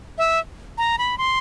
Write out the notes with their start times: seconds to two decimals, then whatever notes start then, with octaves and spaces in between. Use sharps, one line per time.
0.18 E5
0.78 A#5
0.98 B5
1.18 C6